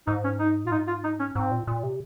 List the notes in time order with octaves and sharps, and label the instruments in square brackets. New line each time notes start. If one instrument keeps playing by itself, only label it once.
[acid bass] G#2 [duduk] D#4
[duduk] C#4
D#4
[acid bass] A#2 [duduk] F4
[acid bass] G#2 [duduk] D#4
[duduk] F4
D#4
C#4
[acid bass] G#2 [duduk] C4
[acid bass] A#2
A#2
C3